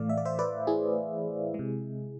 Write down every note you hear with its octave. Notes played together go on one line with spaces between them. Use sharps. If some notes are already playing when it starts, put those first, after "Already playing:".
Already playing: A2 E3 A3 D5 F5
E5
D5
C5 E5
B4 D5
E4 G#4
C3 G#3